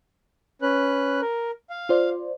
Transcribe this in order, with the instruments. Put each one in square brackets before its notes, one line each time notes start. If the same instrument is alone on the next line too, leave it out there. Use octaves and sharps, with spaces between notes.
[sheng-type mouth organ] C#4 B4 F#6
A#4
F5
[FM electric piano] F4 C5 D5